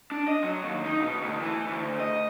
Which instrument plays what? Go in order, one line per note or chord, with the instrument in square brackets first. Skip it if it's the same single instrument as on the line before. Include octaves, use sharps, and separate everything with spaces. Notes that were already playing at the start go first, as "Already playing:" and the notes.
[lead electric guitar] D4
D#5
F#3
D#2
D#4
B2
D2
E3
D2
D#5